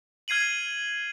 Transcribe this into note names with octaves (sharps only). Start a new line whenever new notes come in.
F6 G#6 C7 D#7 F#7